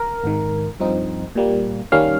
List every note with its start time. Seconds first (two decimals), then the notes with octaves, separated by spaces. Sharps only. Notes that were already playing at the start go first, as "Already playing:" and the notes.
Already playing: A#4
0.24 G#1 G#2 D#3
0.80 G2 F3 C4 D#4
1.35 A#2 G3 A#3
1.92 D#2 D#3 G3 A#3 C#4 F5